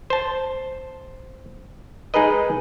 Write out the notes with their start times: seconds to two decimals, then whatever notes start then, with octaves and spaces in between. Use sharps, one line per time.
0.10 C5 A5
2.14 G#3 D#4 G#4 A#4 B4 D#5